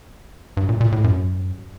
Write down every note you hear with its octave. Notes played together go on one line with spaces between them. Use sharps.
G2
A#2
A#2
A2
F#2